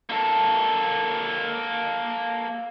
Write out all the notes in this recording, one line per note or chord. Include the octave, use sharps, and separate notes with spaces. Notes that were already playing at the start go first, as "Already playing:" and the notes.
A#3 A4